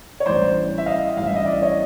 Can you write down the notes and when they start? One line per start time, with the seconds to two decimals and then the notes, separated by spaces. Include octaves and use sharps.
0.20 C#5
0.26 A1 G2 E3 C5 D5
0.78 E5
0.86 D#5 F5
1.16 A1 G2 E3 F5
1.26 E5
1.36 D#5
1.46 D5 E5
1.62 C#5 D#5